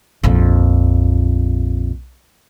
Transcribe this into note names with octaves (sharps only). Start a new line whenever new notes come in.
A#1 F2